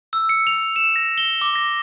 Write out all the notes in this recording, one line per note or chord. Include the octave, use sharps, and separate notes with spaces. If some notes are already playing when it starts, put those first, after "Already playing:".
E6
C#7
F7
E7
A#6
G7
D6
A#6